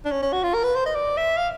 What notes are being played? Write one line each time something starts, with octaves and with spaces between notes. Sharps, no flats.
D4
C#4
C#4
F#4
F4
A#4
B4
C5
D#5
D5
E5
F5